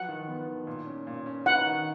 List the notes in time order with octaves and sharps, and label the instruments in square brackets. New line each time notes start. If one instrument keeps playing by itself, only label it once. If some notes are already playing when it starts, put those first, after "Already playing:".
Already playing: [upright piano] F3 F#3 [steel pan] F#5
[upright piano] D#3
B3
D#3
A#2
C#4
A#2
C#4
[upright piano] D#4 [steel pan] F#5
[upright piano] D#3